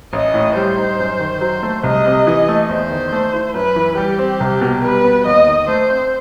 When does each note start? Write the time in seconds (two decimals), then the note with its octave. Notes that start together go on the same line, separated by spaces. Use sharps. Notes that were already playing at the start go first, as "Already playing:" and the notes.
0.13 A1 D#5
0.34 A2
0.55 G3 C5
0.77 D#4
0.99 F#2
1.19 D#3
1.41 F#3 C5
1.63 A3
1.84 C2 D#5
2.06 C3
2.27 E3
2.48 A3
2.69 E2 C5
2.90 D#3
3.12 A3
3.34 E4
3.54 F#2 B4
3.76 E3
3.97 G3 G4
4.19 C4
4.40 C2
4.61 B2
4.83 G3 B4
5.04 B3
5.26 D#2 D#5
5.47 D#3
5.68 A3 C5
5.90 C4